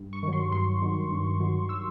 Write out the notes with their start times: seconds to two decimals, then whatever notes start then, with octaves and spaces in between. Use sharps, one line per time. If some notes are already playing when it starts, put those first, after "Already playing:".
Already playing: G2
0.13 C#6
0.23 D#3 F#3
0.33 C6
0.52 G2 C6
0.82 D#3 F#3
1.11 G2
1.40 D#3 F#3
1.69 E6